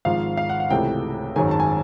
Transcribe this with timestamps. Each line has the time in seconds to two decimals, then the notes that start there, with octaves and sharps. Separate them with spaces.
0.05 G#1 G#2 F3 F5
0.37 F5
0.49 F#5
0.60 F#5
0.70 C#2 C3 E3 A3 G5
1.35 G#1 F#2 D#3 G#3 G#5
1.51 A5
1.60 G#5